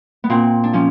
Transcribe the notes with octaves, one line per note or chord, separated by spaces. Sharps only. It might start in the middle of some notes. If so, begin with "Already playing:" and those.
B3
A#2 C4
D4
F3 C#4